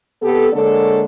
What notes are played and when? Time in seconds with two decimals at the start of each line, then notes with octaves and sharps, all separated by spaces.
0.22 C3 B3 G4 A4
0.53 D3 G#3 A#3 D4 A4 C#5